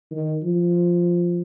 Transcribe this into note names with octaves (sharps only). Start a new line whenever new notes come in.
D#3
F3